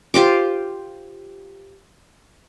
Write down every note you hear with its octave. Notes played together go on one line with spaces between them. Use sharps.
F4 G4 C5 D6